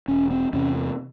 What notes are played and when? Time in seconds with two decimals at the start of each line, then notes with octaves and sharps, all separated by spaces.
0.08 E1 C#4
0.31 C4
0.53 E2 C3 C#4